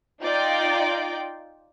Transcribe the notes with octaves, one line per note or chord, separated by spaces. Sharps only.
D#4 F4 D5 G5